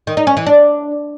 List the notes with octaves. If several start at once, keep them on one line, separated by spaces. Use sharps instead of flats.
D#3
D#4
C#4
E3
D4